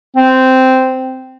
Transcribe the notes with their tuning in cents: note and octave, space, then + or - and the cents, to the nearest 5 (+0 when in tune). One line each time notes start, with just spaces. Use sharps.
C4 -10